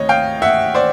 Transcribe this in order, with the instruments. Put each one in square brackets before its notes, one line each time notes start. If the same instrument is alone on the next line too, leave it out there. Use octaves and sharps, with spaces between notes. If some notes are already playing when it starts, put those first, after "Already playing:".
Already playing: [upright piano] D2 C3 D#3 C#5 D#5
F5 G5
E5 F#5
C5 D5